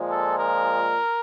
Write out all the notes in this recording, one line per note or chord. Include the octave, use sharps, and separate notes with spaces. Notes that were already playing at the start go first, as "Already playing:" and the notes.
Already playing: A#2 F3 G#3
A4
A#4